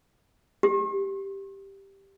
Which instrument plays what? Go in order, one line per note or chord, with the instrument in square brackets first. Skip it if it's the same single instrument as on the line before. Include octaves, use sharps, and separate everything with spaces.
[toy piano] G4